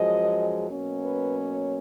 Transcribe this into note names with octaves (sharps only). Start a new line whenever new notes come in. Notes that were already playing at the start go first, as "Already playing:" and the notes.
Already playing: F#2 F3 G#3 D#5
B2 F#3 A#3 C#4
B4
C#5